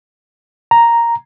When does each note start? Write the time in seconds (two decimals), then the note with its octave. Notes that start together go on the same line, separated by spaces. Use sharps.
0.71 A#5